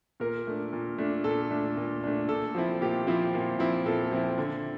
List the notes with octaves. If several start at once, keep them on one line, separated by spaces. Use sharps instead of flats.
A#2 A#4
A3 D4
A#2
A3 D4
A#2 A4
A3 D4
A#2
A3 D4
A#2 A4
F3 C4 E4
A#2 G4
F3 C4 E4
A#2
F3 C4 E4
A#2 A4
F3 C4 E4
D3